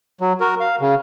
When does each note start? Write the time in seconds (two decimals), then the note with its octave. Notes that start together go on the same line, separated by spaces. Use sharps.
0.21 F#3
0.40 F#4 A#4
0.60 F5
0.81 C#3